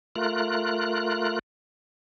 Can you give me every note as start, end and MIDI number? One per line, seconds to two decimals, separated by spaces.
0.16 1.39 57
0.16 1.39 65
0.16 1.39 70
0.16 1.39 90